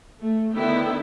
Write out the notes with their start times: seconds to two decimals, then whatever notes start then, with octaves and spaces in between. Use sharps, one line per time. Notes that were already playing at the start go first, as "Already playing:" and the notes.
0.22 A3
0.54 D3 D#3 B3 E4 E5 G5